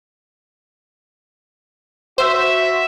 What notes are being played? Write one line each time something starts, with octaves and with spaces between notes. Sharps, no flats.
F#4 C5 E5